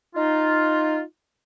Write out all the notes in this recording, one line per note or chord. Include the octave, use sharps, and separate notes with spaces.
D#4 F4